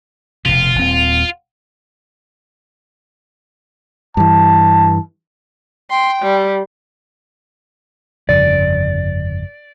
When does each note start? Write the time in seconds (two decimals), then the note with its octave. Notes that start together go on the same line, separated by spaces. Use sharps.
0.46 F1 B2 F4
0.75 D#1 C4
4.17 G2 E3 A5
5.90 G5 C6
6.22 G3
8.29 G1 F2 C#3 D5